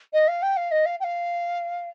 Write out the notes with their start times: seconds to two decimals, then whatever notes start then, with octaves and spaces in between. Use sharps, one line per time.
0.13 D#5
0.27 F5
0.42 G5
0.56 F5
0.71 D#5
0.85 F5
0.99 G5
1.03 F5